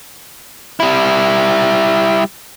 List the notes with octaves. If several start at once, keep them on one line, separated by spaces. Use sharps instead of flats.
G3 E4